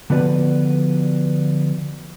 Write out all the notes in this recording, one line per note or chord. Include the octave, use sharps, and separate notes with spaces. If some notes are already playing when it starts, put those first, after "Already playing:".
D3 F3 B3 F#4 B4 D5